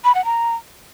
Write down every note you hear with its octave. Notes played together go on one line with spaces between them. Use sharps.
B5
F#5
A#5